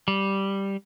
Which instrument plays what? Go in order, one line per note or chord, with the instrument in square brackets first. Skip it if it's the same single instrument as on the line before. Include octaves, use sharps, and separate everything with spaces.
[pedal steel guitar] G3